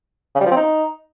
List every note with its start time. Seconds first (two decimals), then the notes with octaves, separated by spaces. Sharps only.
0.35 C#3
0.41 G3
0.46 F3
0.51 C4
0.57 D#4